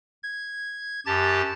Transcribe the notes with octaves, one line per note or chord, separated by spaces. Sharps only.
G#6
F#2 G4 A5 A6